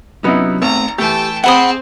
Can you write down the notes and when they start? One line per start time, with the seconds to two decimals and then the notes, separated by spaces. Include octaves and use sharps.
0.24 C3 F#3 B3 C#4 D#4 E4
0.62 G#1 A3 B3 C4 A#5
0.98 E3 A3 G4 G5 A5
1.44 C4 G#4 C5 E5 F#5 B5 D#6